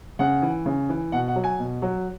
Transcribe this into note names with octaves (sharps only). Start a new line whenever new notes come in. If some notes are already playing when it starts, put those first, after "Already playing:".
C#3 F#5
E3
C#3
E3
B2 F#5
F#5
F#3
G#5
B2
F#3